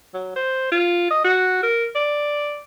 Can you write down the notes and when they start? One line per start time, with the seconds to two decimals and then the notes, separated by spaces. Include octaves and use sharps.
0.14 F#3
0.36 C5
0.71 F4
1.11 D#5
1.24 F#4
1.63 A#4
1.95 D5